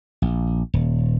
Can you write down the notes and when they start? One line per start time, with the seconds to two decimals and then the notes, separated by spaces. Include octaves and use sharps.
0.22 A#1
0.74 D#1